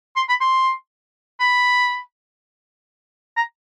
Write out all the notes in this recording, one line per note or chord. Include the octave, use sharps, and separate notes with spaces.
C6
B5
C6
B5
A#5